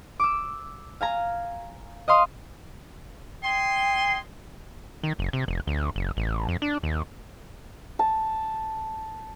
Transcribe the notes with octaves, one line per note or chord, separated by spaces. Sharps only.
D6 E6
F5 G#5 A#5
D#5 F5 C6 D#6
D#5 G5 G#5 C6
D#3
F#1
C3
F1
D2
F#1
A1
F2
D4
D#2
A5